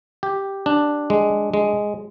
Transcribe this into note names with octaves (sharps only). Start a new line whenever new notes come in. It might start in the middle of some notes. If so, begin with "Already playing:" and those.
G4
D4
G#3
G#3